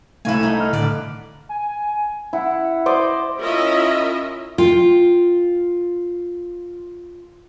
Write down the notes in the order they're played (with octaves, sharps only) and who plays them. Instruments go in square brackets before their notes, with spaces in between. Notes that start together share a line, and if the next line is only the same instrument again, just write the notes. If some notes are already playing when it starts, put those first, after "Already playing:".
[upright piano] C2 F5 [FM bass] A3 [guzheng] E4 G#5
[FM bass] A3 [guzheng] D#4
[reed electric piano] D#5 F6
[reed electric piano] A2 [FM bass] D3 [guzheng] B4 D5
[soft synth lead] G#5
[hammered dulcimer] E4 [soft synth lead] F#5
[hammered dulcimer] C5 D5 D#5
[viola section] C#4 E4 F4 A#4 D#5 E5
[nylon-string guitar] F4 G5